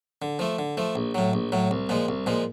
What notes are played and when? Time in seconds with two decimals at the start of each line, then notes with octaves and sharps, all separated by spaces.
0.22 D3
0.39 F3 A3
0.59 D3
0.77 F3 A3
0.95 A#1
1.15 A2 F#3
1.33 A#1
1.52 A2 F#3
1.71 C2
1.89 A#2 F3 G#3
2.08 C2
2.26 A#2 F3 G#3